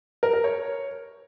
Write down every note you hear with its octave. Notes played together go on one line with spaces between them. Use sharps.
A#4
A#4
C#5